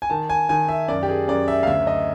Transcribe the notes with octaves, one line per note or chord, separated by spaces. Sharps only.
G#5
D#3 A5
G#5
D#3 G#5
E5
F#2 D5
G4
G#4
F#2 D5
E5
F5
D2 E5
D#5